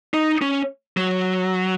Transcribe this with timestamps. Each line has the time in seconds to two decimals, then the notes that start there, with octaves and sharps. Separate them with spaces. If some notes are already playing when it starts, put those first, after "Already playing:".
0.14 D#4
0.42 C#4
0.97 F#3